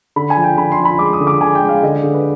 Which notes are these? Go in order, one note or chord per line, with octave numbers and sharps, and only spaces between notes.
D3 B5
G#5
F3
G5
D3 B5
C6
F3
B5
G#3 D6
D#6
D3
D6
D3 G#5
G5
G#3
F5
D3 D#5
D3
B4